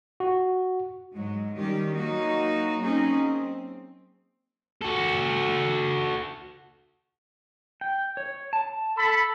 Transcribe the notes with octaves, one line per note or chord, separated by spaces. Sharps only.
F#4
G#2 F#3 G#3
D#3 G3 C#4 G4
F#3 A#3 D#4 F#4
F#3 A#3 C4 C#4 D#4 G#4
C4
F#4 A4
G5
C#5
A5
A4 B5